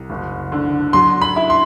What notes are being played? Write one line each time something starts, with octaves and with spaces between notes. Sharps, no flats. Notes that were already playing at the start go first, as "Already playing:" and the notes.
Already playing: C2
F#1
D3
F#3 C6
B5
E4
C6